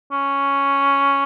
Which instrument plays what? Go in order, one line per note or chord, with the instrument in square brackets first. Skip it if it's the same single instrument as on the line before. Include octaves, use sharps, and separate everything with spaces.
[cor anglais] C#4